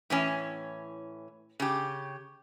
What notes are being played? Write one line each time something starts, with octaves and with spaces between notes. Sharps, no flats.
A2 E3 C#4
C#3 G4